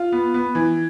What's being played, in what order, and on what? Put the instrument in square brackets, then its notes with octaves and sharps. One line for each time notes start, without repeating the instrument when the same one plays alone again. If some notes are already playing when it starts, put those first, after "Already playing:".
Already playing: [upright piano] F4
B3
B3
E3